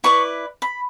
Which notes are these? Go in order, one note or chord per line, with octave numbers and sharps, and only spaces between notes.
E4 B4 D5 C#6
B5